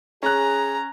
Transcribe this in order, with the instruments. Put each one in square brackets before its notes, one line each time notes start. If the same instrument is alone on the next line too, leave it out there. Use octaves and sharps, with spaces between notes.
[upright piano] C#4 F#6 [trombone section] G#4 [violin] A#5